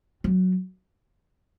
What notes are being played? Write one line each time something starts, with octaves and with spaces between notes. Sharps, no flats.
F#3